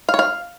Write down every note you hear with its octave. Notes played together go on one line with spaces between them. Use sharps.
F5
C#5
F5